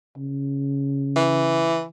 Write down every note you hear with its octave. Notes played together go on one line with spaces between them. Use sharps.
C#3
E3